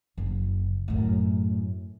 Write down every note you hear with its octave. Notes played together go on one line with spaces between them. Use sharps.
F#1
F#2 A2